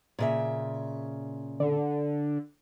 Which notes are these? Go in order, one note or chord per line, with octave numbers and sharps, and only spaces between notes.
A#2 C#3 E5
D3